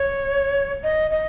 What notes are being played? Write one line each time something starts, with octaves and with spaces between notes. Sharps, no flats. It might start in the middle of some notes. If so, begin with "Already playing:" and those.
Already playing: C#5
D#5
D#5